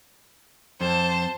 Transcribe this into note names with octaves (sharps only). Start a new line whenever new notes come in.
F2 C5 A5